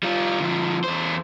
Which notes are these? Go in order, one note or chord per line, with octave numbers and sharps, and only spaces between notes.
G3 F4
D3 F3
E2 C5